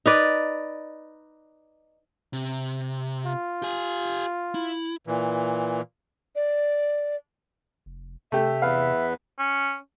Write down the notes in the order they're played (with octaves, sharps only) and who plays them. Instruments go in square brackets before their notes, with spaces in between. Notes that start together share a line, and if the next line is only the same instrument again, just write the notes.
[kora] D#4 B4 D5
[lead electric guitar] C3
[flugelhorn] F4
[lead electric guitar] G4 G#5
E4
[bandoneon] A#2 E3
[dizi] D5
[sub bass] F1
[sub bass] C3 [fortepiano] A3 G4 [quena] E5
[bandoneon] E2 B3 B4 [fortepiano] F5
[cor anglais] C#4